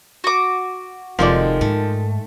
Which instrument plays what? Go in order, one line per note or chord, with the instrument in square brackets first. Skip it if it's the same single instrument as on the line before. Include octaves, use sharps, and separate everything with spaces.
[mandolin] F#4 D6
[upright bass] F1 [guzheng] D#3 G#3 A3 [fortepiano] F3 D5
[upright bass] G#2 [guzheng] A3